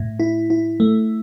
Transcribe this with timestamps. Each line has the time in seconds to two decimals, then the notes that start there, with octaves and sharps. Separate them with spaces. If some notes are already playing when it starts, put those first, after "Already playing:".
Already playing: A2
0.20 E4
0.50 E4
0.80 A3